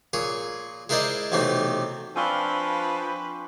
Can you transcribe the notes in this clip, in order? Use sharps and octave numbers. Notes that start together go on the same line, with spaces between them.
A#2 G#4 C#5
G#3 E4 A#4 C5 D5 D#5
B1 C3 E3 A3 C4
F3 C4 D4 B4 F5 G#5 C#6 G7